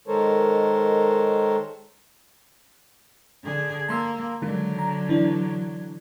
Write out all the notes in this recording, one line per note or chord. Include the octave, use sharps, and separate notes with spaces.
D#3 G#3 A4 A#4 C5 C#5
D3 G#4
A#3 A5 C6 E6
D3 D#3 F#3 G#3
A#5
E3 D4